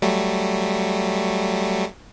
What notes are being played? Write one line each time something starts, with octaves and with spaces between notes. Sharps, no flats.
F#3 G3 A3